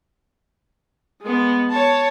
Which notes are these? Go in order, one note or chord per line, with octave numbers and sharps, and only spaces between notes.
G#3 B3
C#5 A5